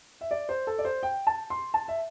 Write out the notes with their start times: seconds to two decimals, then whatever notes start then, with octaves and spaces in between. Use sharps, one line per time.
0.21 E5
0.31 D5
0.49 C5
0.67 A4
0.79 D5
0.85 C5
1.03 G5
1.27 A5
1.50 C6
1.74 A5
1.88 E5